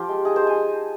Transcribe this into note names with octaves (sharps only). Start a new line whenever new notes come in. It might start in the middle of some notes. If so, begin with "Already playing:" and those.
Already playing: F3 F4 G4
G#3
D#4 G#4
C5
G#3
G#5